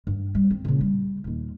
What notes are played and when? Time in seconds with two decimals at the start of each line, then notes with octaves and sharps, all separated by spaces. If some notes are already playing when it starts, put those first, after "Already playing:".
0.07 G2
0.35 G3
0.50 C4
0.65 A#2 C#3
0.81 G3
1.24 D#2 A#2